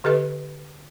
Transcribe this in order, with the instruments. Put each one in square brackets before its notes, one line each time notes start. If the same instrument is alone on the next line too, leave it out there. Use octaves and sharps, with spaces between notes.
[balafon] D3 G4 A4 B4 D#5